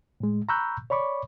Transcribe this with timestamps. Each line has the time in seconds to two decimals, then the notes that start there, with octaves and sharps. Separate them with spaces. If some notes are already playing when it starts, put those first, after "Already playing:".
0.20 A2 G#3
0.49 A#5 B5 C#6 E6 F#6 G6
0.90 C#5 D5 B5 C#6 D6